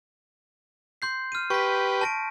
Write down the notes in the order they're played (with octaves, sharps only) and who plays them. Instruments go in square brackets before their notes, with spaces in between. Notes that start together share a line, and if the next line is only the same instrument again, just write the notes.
[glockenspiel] C6 G6 C7
F6 D#7
[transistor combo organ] G4 B4 [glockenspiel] C#6 B6
[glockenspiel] A5 A#6 D7